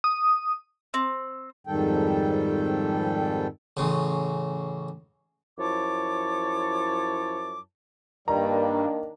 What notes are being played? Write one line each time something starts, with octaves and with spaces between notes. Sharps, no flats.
D#6
C4
F2 G#2 D#3 G3 A4 G5
A1 C#3
F#2 F3 E4 C#5 A5 D6
G2 D#3 G3 A#3 D4 A#5